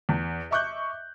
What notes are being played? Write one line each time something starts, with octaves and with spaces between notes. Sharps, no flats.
E2
D#5 E5 C#6 D6 F#6 G6